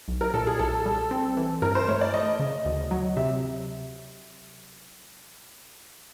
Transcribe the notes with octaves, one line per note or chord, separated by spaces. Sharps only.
B1
A#4
A#2 A4
G#4
B1 A4
G3
C4
E3
G2 A#4
C5
A3 C#5
D5
A3 D#5
C#3
D2
F#3
C3 E5